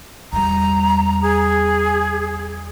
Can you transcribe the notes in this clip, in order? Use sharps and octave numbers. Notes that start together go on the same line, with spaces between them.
E2 G3 A#5
G#4